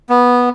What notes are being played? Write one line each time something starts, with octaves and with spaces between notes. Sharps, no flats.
B3